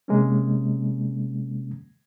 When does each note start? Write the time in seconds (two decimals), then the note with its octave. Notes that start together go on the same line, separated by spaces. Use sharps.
0.08 C3 G#3 A#3 C#4